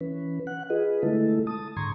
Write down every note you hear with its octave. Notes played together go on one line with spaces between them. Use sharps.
E3 C#4 B4
F#5 F#6
F4 G#4 B4 D#5
D3 G#3 A3 E4 A4
A5 D#6
G#2 D3 A#5 C6 C#6 G#6